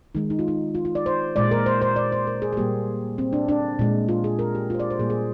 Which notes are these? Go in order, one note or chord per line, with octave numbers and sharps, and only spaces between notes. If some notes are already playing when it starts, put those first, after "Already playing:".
D#3 G#3 D#4
D#4
F4
D#4
F4
F4
D5
C5
A#2 G#3 D5
A#4
C5
C5
D5
C5
A#4
G#4
G#4
A#2 G3 A#3 G4
C4
D4
D4
A#2 G#3
F4
G#4
A#4
G4
F4 C5
D5
C5
A#2 G3 A#3 G#4
G#4